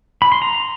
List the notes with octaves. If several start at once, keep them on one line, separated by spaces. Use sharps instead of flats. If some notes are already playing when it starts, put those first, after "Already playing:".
B5
C6
A#5